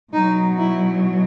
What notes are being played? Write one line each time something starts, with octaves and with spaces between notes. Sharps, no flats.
B2 F#3 D#4
E4